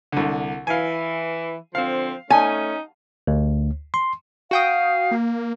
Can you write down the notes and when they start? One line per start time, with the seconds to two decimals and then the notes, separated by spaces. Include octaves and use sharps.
0.12 C2 D3
0.67 E3 F5 G#5
1.75 D3 F3 C4 F5
2.30 A3 C#4 D#4 G#5
3.27 D2
3.94 C6
4.51 F#4 F5 G5 D#6
5.11 A#3